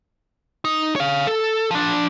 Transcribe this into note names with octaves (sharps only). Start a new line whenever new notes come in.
D#4
C#5 F5
A4
F3 D4